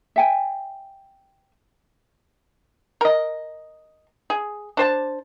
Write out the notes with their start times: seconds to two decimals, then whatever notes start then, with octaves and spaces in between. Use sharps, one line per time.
0.16 E5 G5 G#5
3.01 A#4 D#5
4.30 G#4
4.77 D4 C5 A5